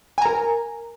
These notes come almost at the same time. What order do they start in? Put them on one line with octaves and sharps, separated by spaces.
G#5 A#5 A#4